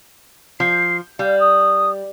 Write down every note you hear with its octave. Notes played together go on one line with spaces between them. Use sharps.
F3 C7
G3 F5
D#6